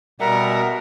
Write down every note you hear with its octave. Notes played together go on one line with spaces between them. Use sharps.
B2 G3 A#4 E5 F#5